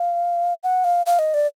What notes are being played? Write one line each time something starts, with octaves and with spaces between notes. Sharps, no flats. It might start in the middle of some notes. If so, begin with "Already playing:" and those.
Already playing: F5
F#5
F5
F5
D#5
D5